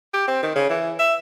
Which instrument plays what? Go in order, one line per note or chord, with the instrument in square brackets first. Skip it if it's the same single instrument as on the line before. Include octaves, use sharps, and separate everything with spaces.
[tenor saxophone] G4
C4
D#3
C#3
E3
E5